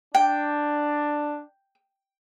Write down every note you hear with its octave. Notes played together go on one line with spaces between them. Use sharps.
D4 G5